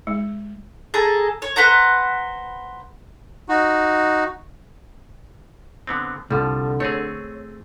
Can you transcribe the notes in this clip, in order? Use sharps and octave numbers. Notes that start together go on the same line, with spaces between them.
G#3
G#4 A4 A5 A#5
C#5
B4 C5 F#5 A#5
D#4 F#4
D3 B3 C4
C2 D3 F3 G3
A3 C4 G#4 C#5